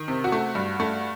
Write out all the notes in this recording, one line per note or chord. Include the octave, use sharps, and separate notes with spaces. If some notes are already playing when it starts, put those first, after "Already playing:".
Already playing: D#3
C3
F#4
A3
G2
A3